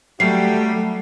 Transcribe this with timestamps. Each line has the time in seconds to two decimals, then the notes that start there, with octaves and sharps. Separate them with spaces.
0.20 F#3 G3 A3 G4 C7